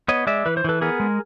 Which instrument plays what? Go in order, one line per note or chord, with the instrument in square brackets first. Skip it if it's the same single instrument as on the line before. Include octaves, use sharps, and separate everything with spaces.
[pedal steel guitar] B3 C#5 D#5
G#3 D5 E5
E3 B4
C5
E3 A4 B4
B3 G#4 A#4
G#3